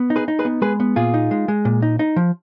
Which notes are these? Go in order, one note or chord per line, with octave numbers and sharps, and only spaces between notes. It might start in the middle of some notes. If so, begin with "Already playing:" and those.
Already playing: B3
D#4
G#4 B4
D#4
G#4 B4
B3
G#3 G#4 B4
B3
A#2 F4 G#4
D#4
G#3
G#3
A#2
D#4
D#4
F3